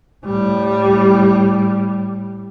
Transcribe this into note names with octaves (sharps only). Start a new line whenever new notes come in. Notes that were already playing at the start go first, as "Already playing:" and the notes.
A2 G3